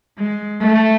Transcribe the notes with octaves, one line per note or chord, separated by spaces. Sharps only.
G#3
A3